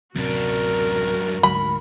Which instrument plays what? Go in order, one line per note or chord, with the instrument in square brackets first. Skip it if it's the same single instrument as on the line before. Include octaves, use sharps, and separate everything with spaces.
[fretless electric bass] D1 C3 [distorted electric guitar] F#2 D4 [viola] F#4 A#4
[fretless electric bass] D2 G#2 [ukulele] B5